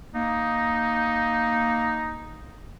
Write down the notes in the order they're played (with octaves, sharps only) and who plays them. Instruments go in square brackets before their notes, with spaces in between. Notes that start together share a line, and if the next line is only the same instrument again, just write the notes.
[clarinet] A#3 [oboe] D#4